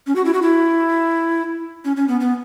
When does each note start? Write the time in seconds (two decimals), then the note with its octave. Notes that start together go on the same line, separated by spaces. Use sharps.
0.07 C#4
0.16 F#4
0.25 E4
0.33 F#4
0.42 E4
1.85 C#4
1.96 C#4
2.08 B3
2.20 B3